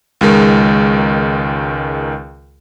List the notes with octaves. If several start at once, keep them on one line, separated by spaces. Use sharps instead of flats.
C#2 D#3 G#3 A#4